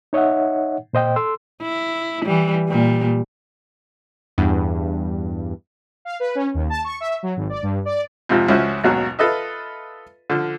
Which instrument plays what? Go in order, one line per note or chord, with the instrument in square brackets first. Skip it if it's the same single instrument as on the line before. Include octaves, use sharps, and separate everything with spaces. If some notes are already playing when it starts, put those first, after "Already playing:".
[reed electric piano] D#4 C#5 D#5 E5 F#5
A#2 C5 D#5 G5
A4 C6 E6
[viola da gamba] E4
E3 G3
A#2 G3
[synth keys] E2 G2
[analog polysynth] F5
B4
C#4
D#2
A5
C#6
E5
F#3
G#1
D5
G2
D5
[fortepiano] F2 G#2 C3 F3
C#2 F3 C#4 E4 F#4 C5
G#1 D#2 B2 F#3 F#4
F4 A4 B4 D#5 E5
D3 F3